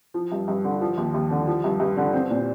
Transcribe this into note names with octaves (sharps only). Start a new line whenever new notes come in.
F3
G2
G2
D3
F3
D#2
D#2
D3
F3
G2
G2
D3
C4
A#2